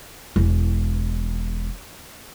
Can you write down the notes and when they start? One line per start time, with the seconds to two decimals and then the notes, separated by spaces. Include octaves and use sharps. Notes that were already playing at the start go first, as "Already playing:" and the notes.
0.36 E1 E3